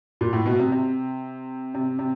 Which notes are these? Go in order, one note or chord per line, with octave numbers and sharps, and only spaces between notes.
A#2
A2
B2
C3
C3
C3
C3